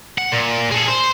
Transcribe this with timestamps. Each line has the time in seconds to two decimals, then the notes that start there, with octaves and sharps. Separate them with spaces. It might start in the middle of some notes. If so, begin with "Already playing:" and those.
0.18 F#5
0.32 A#2
0.72 G#4 A4
0.89 C5